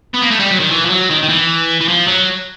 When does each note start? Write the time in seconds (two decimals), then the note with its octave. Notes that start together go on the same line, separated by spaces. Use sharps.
0.14 B3
0.22 A#3
0.31 A3
0.40 G3
0.51 F#3
0.60 D#3
0.71 E3
0.85 F3
0.89 F#3
1.10 D#3
1.23 D#3
1.29 E3
1.81 E3
1.89 F3
2.08 F#3